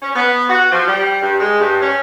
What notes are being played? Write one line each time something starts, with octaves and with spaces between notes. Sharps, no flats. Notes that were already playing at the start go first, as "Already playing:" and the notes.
C#4
B3
F#4
F3
G3
G2
G#3
G2
C#4